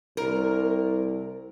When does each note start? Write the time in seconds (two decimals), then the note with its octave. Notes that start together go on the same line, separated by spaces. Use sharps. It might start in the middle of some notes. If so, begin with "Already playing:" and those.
0.17 C2 A#4